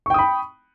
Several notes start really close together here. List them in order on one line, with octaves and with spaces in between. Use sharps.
C#6 G5 D#6 B5